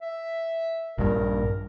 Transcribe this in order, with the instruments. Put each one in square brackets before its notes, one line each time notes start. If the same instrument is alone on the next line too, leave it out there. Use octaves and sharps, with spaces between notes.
[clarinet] E5
[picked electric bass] A#1 G2 [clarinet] A#4